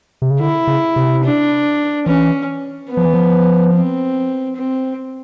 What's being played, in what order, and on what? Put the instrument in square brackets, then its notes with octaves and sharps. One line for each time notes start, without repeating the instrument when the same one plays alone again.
[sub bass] C3
C#3
[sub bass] D3 [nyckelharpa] E4
[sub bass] C#3
C3
[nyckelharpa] D4
[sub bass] E3 [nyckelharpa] C#4
[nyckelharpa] B3
[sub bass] F3
E3
F3
[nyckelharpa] C4
C4